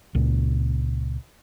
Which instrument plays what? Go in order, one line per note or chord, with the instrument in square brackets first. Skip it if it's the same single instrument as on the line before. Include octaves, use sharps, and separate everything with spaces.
[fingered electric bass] C#2 A#2